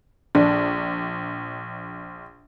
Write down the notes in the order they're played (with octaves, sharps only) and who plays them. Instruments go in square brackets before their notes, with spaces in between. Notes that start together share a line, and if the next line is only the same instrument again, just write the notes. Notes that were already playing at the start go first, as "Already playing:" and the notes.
[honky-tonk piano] A#1 [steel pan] D4